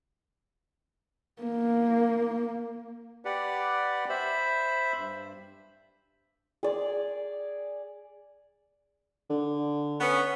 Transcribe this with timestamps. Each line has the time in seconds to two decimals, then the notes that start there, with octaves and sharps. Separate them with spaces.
1.42 A#3
3.25 G4 B4 D5 F#5
4.09 C5 E5 B5
4.97 G2
6.63 G#4 D5
9.30 D3
10.00 B3 C#4